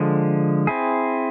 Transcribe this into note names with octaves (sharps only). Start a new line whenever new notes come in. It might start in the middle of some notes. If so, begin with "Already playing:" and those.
Already playing: D3 F3 G#3
C4 E4 G#4